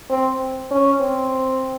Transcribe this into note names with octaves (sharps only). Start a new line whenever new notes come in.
C4
C#4
C4